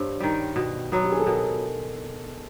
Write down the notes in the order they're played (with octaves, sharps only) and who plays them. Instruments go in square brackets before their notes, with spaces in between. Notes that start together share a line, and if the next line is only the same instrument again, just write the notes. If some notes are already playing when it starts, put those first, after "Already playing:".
Already playing: [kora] G2 [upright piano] C5 C#5
[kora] D#3 G3
B2
F#3 B3
[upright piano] G4
G#4
A4
[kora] B2 [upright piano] A#4